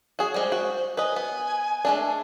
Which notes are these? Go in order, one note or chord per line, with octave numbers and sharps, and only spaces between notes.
F#4 G#4
G3 G#3 C5
F#4
B4 D#5 G#5
B3
G#3 A3 D4